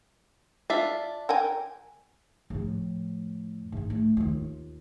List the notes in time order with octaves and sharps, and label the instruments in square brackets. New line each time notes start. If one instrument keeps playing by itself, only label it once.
[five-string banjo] D4 F4 E5
[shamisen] A#4 G5 G#5
[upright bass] F2 A2
G#2 G#3
A3
D#2 F4